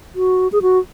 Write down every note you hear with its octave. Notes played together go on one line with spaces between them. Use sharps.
F#4
G#4
F#4